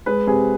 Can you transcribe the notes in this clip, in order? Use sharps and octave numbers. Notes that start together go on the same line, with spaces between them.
G#3 B4
C3 G#4